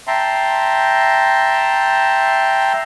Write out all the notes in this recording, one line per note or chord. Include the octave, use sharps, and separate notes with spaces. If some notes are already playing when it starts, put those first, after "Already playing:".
E5 G5 A5 A#5 C6